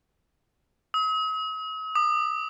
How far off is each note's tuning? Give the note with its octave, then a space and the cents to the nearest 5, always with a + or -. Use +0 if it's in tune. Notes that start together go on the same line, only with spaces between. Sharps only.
D#6 +45
D#6 -40